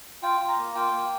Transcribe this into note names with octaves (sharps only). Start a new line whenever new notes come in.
F4 G5
F4
A#5
A#3
F4 G5
A#3